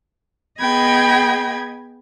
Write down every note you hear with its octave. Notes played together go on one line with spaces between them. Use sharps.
B3 G#4 D#5 G5 B5 G#6